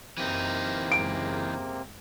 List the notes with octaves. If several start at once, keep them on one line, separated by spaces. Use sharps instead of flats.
F#2 C3 E3 A#3 C4 D#4
F#1 G#3 D7